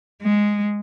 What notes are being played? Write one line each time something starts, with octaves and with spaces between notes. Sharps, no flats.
G#3